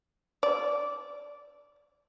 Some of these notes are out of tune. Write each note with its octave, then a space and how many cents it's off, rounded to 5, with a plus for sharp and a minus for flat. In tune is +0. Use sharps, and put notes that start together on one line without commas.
D5 -10